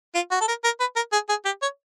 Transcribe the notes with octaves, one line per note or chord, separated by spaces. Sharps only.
F4
F#4
A4
A#4
A#4
B4
A#4
G#4
G#4
G4
C#5